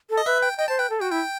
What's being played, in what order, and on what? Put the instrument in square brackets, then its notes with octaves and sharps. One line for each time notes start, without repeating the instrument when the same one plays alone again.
[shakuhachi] A4
[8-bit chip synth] D#5
[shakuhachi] B4 [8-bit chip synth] E5
[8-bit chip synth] G5
[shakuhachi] D#5 [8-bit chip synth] G5
[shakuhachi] C5 [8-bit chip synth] A5
[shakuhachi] B4 [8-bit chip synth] G5
[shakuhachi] A4
[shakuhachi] F#4 [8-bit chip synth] G5
[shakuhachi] E4 [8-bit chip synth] G5